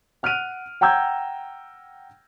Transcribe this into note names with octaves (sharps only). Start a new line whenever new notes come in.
F#5 F6 F#6 D7 D#7 F7
F#5 G5 A#5 E6 G6 G#6